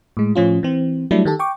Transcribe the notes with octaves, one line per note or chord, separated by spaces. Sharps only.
A2 G#3
A2 F3 C#4 F4
E3 C4
F#3 G3 A3 D4 E4
D#3 G4 A4
G5 C#6 D6